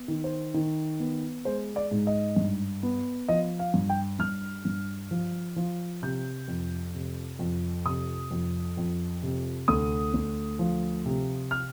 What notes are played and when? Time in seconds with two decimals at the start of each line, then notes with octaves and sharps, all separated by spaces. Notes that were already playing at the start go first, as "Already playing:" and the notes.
Already playing: B3
0.08 D#3
0.24 C5
0.54 D#3
1.00 B3
1.45 G#3 C5
1.76 D5
1.91 G#2
2.07 D#5
2.36 G2
2.83 B3
3.28 F3 D#5
3.59 F5
3.74 G2
3.89 G5
4.19 G2 F6
4.65 G2
5.11 F3
5.56 F3
6.02 C3 G6
6.48 F2
6.95 C3
7.39 F2
7.85 C3 D#6
8.31 F2
8.77 F2
9.23 C3
9.68 D2 D#6
10.14 D2
10.59 F3
11.06 C3
11.51 F6